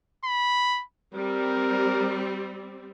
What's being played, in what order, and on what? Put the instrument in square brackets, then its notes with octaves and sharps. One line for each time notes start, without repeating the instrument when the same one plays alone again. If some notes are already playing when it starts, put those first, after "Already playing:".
[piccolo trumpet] B5
[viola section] G3 C4 [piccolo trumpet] A#4